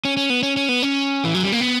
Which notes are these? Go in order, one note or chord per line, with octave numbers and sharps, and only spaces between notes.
C#4
C#4
B3
C#4
C#4
B3
C#4
E3
F#3
G3
A#3
B3